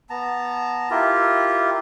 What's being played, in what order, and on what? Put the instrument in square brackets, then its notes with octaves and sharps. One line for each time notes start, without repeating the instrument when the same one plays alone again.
[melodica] B3 A5 A#5
E4 F4 G4 A#4